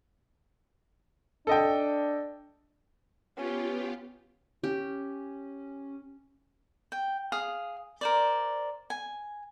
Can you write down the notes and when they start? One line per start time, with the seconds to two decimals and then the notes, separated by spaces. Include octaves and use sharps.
1.47 D4 A4 D#5 G5
3.37 B3 C#4 F4 G4
4.63 C#4 G4
6.92 G5
7.32 G#4 F5 D#6
8.01 A#4 C5 D5
8.90 G#5